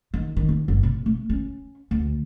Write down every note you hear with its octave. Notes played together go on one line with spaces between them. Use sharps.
D#3
D#3
D#2
G1
C3
A3
C#4
D2